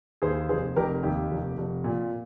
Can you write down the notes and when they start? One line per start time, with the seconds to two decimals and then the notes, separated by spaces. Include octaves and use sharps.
0.22 D#2 G#4 C5
0.49 F1 G#4 C5
0.76 F1 G4 A#4
1.03 D#2 G4
1.31 F1
1.58 F1
1.84 A#2